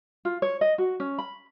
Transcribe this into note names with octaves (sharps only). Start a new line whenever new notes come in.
F4
C#5
D#5
F#4
C#4
B5